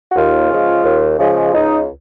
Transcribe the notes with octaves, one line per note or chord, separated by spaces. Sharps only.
F#4
D#2 F4
C#3 F3 G#3
D#2
C#3 F3 G#3
C#2 D#4